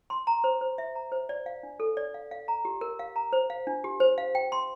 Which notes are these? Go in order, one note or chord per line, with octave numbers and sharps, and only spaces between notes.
C6
A#5
C5
C5
E5
A#5
C5
D5
F5
D4
A4
D5
F5
F5
A#5
G4
A#4
F5
A#5
C5
F5
D4
G4
C5
F5
G5
C6